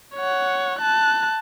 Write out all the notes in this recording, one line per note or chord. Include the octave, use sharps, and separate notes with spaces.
C#5 F#5
A5 F#6